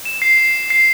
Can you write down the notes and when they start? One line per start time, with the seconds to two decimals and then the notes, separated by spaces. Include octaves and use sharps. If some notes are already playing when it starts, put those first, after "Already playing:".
0.05 E7
0.22 C7
0.70 C7